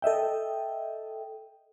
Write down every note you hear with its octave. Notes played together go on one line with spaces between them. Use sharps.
A4 D#5 E5 G5